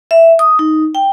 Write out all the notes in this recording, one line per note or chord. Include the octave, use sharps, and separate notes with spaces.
E5
D#6
D#4
G5